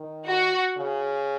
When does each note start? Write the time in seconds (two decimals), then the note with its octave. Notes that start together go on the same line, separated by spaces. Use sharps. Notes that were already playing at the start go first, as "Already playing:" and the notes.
Already playing: D#3
0.26 F#4
0.77 C#3